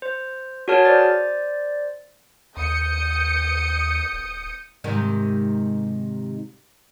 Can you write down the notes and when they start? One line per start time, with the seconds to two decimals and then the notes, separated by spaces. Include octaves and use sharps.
0.02 C5
0.68 F#4 G#4 A#4 C#5 A5 F6
0.85 C5 D5 A6
2.57 D#2 D#6 G6 C#7
4.13 D#1
4.84 G#2 C3 D#3